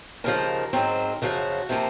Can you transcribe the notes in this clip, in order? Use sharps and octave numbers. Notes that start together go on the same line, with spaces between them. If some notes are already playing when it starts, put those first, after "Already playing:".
D#2 C#3 F3 A#4
G#2 F#3 C4
F#2 C#3 F3 F#4
C3 F3 A#3 C4